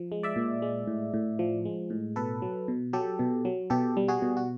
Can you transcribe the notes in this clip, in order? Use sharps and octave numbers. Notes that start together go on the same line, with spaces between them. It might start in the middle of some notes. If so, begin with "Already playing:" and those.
Already playing: F3
G#3
D5 E5
A#2
G#3
A2
A2
F3
G#3
A2
B2 A4 B4
F#3
B2
F#3 G4 A4
B2
F#3
B2 G4 A4
G3
F#4 G#4
B2
F#4